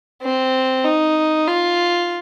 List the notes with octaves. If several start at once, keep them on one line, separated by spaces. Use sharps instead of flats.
C4
D#4
F4